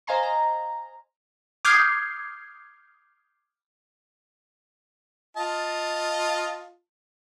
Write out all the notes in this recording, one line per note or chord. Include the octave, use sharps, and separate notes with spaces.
C5 D#5 F5 G#5 A#5 C6
A#5
D6 D#6 F6 G6 G#6 C7
F4 D#5 A5